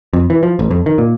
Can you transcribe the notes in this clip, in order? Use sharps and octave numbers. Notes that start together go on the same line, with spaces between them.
F2
E3
F3
A1
F2
D#3
A#2